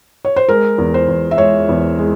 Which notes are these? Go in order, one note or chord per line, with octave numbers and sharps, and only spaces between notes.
C#5
C5
G#3 A#4
E2
C5
E2
E5
G#3 C#5
E2
G#3